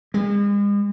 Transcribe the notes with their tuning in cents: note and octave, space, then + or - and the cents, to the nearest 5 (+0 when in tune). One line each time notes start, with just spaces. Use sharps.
G#3 -40